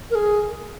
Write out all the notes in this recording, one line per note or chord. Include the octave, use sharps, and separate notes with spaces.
A#4
G#4